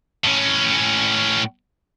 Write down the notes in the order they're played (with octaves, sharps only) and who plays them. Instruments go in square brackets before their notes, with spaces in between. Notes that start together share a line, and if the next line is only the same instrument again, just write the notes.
[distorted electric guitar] A2 C#4